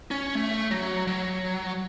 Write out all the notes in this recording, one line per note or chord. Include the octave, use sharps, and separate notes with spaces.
C#4
A3
F#3
F#3